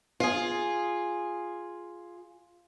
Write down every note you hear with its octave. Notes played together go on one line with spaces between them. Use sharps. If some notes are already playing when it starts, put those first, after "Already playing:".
F4 G#4